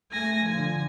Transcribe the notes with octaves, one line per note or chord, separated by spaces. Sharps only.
A3 G#5 A#6
D3 F3 G#5